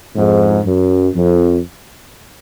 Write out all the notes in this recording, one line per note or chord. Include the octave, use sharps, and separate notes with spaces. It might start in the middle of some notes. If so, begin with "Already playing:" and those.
F2 G#2
F#2
F2